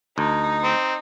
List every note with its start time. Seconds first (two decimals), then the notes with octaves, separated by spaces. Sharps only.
0.18 D2 D#4
0.63 C4